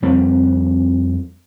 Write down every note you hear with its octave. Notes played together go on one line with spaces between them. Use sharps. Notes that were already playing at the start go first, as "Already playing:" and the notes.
F2 G3 B3 C4